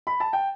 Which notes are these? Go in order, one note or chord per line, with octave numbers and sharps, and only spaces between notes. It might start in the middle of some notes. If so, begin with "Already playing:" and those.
B5
A5
G5